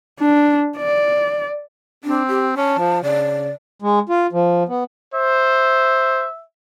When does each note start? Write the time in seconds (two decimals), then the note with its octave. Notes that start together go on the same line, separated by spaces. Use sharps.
0.20 D4
0.78 D5
2.04 C4 D4
2.28 G4
2.57 C#4 A5
2.79 F3
3.03 C#3 D5
3.82 G#3
4.09 F4
4.33 F3
4.69 B3
5.14 C5 E5